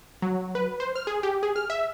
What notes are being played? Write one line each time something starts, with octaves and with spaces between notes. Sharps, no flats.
F#3
B4
C5
F6
G#4
G4
G#4
F6
E5